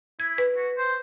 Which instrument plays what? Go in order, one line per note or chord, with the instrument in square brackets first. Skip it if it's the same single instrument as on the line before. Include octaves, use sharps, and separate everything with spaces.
[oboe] E4 [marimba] G#6
[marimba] B4
[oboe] F#4
C5